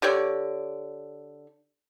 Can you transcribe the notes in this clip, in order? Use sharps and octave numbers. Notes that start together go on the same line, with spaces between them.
D3 G4 C#5 D5